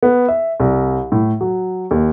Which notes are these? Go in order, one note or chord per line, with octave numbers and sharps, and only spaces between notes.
B3
E5
C2
A2
F#3
D#2